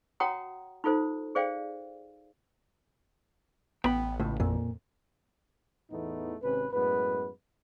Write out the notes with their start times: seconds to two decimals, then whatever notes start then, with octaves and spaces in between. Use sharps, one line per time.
0.20 F#4 C#5 F#5 G5 A#5 D#6
0.84 D#4 F4 A4 C5
1.35 G#4 C5 D5 F5 G5
3.84 A1 B3 G5 B5
4.20 C#2 A2
4.40 F2 A#2
5.91 E2 A2 E3 A3 B3 D#4
6.42 G#1 C3 C#4 B4
6.72 F#2 A2 G#3 B3 B4